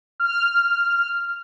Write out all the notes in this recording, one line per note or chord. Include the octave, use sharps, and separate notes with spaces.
F6